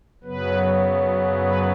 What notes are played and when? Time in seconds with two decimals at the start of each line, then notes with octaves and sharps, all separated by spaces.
0.24 F#2 C#3 F#3 B3 B4
1.41 B4